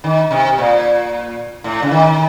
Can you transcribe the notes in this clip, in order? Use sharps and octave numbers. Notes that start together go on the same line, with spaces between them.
D#3
C3
A#2
A2
C#3
D#3